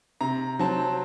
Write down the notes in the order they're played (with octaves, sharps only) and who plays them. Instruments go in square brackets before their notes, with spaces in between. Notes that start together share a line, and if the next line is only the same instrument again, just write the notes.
[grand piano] C3 A#5
F#3 C4 A5